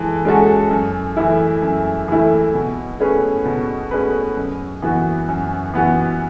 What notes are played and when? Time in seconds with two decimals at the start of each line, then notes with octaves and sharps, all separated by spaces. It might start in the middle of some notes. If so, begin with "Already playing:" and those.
Already playing: E3 G#3 A4
0.25 G#3 C#4 F#4 A4
0.71 F#2
1.17 E3 A3 E4
1.62 F#2
2.08 E3 A3 E4
2.54 B2
3.00 A3 C#4 G#4 B4
3.45 B2
3.91 A3 C#4 G#4 B4
4.37 F#2
4.82 E3 B3 F#4
5.28 F#2
5.74 E3 B3 F#4